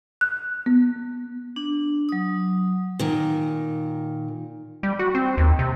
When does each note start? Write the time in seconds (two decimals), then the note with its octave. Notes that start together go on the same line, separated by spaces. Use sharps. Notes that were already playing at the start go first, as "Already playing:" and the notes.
0.21 F#6
0.66 B3
1.56 D4
2.09 F#3 D#6
2.99 A#2 D#3
4.83 G3
4.99 F#4
5.15 C4
5.37 D#2
5.59 C3